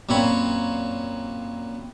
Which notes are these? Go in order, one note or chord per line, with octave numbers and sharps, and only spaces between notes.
F#2 A#2 C4 C#5 B5